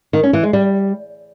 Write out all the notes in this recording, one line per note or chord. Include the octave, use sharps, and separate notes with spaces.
D#3
C#4
E3
G#3
G3